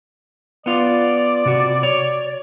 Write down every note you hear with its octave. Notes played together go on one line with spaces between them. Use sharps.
B3 F4 D5
C3 F#4
C#5